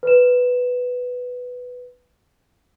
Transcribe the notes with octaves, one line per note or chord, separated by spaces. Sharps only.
B4 E7